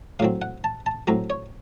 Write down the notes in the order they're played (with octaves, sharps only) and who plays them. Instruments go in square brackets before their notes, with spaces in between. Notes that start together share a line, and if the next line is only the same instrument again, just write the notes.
[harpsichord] A2 F#3 C4 F5
F#5
A5
A5
A2 F#3 C4 A#5
C#5